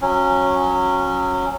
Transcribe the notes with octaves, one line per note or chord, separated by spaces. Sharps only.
F#3 C#4